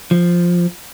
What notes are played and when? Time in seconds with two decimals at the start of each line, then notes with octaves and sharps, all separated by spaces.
0.11 F3